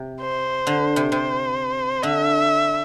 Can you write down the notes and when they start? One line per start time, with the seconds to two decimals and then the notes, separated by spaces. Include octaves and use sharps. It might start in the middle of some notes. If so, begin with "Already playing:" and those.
Already playing: C3
0.21 C5
0.67 D3
0.96 C3
1.12 C3 C5
2.02 D3 E5